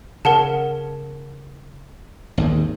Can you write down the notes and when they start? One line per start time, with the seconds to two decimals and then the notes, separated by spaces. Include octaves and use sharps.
0.25 C#3 A#4 F#5 A5
2.38 G#1 D#2 G#2